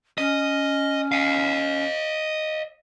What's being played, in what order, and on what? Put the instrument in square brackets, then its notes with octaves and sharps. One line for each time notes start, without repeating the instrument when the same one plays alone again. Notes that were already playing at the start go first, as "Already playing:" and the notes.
[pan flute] C#4 [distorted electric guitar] D#5
[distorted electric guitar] D#5 F5